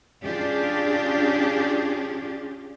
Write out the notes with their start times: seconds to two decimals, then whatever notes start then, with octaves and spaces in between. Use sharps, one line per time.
0.24 C#4 D4 F4 G4 G#4